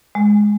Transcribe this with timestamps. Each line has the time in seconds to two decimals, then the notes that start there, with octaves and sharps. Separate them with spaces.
0.15 G#3